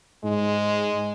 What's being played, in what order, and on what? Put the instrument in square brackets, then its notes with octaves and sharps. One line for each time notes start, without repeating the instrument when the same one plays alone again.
[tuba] G#2 [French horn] G#3